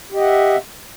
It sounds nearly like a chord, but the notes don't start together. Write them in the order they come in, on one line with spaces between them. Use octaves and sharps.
G4 D#5 F#5 E5